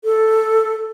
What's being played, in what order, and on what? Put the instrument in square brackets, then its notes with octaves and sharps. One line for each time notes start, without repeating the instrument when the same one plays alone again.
[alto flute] A4